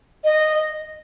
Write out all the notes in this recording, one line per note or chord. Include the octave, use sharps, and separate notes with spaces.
D#5